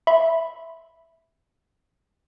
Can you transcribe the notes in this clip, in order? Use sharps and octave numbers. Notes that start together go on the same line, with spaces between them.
E5 B5 C6